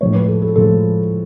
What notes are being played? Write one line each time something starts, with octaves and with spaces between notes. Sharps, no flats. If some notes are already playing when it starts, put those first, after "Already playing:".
A2 F3 G#3 C#5
B4
A4
A4
A2 F3 G#3 A4